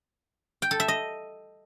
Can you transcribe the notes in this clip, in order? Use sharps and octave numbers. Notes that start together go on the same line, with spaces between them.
G5
A4
E5
D#5